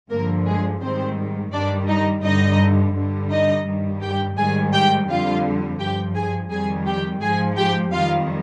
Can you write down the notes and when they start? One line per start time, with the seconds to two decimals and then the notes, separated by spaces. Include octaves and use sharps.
0.11 G2 D3 F3 A#3 A#4
0.46 G#3 G#4
0.81 G#2 D#3 G3 C4 C5
1.53 G2 D#3 G3 D4 D5
1.88 D#4 D#5
2.24 G2 D3 G3 D#4 D#5
2.95 G2 D3 G3
3.31 D#4 D#5
3.66 G2 D#3 G3
4.02 G4 G5
4.37 G#2 D#3 G3 G#4 G#5
4.73 G4 G5
5.08 F2 D3 G3 F4 F5
5.79 G2 F3 G4 G5
6.15 G#4 G#5
6.51 F2 D#3 G3 G#4 G#5
6.86 G4 G5
7.21 G#2 F3 G#4 G#5
7.57 G4 G5
7.92 F2 D#3 G3 F4 F5